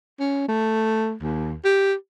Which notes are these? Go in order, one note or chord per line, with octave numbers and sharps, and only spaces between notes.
C#4
A3
D#2
G4